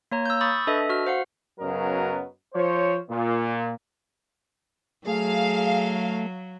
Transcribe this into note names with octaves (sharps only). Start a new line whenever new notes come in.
A#3 C#5 A#5
E6 G6
B5 C#6 D#6 G6 A6
D4 A4 B4 D#5 E5
F#4 F6
C5 F5 F#5
F#2 C#3 F#3 B3 A#4 D#5
F3 C5 C#5
A#2
F#3 A3 G#4 F5